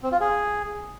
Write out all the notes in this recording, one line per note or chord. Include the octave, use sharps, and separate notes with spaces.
C4
F4
G#4